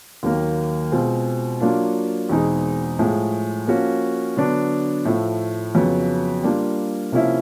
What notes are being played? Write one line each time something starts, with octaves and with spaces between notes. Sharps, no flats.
D#2 D#3 F#3 A#3
B2 G#3 C4 F4
F#3 A#3 D4 F4
E2 B2 G#3 C4 D#4
A2 F3 G#3
F3 A#3 C#4 F#4
D3 F#3 B3 D4
A2 F3 A3
F2 C#3 F#3 B3
G3 A#3 D4 F4
C3 F3 A#3 C#4 E4